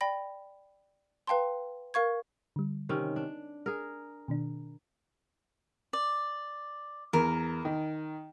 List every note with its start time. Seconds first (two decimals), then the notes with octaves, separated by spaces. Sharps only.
0.01 D5 G5 B5 A#6
1.27 B4 F5 G5 A5 C6
1.94 A#4 F5 C#6 G#6
2.56 D3 G3
2.89 C3 D#3 C#4
3.16 D4
3.66 G#4 A#4
4.28 B2 D#3 D4
5.93 D5
7.13 E2 A#4
7.65 D#3